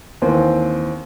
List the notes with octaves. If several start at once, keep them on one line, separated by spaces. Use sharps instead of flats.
D#2 E3 C4